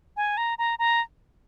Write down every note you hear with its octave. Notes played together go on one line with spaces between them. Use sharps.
G#5
A#5
A#5
A#5